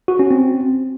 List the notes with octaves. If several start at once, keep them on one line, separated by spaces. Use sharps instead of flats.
F#4
C#4
C4